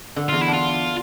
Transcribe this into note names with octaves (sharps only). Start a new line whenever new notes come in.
D3
E2 F4
E4
D4
F4